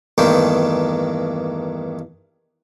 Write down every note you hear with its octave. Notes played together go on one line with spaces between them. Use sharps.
E2 G2 D#3 A3 A#3 C5